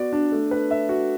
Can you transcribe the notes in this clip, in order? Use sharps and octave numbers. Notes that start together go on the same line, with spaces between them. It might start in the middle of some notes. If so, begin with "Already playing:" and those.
Already playing: B3 F#4 D5
D4
A3
B4
E5
F#4